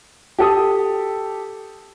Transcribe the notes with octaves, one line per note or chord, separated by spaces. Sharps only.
G4 A4 D#6